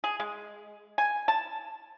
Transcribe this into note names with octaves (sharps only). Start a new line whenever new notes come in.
G#4
G#3
G#5
A5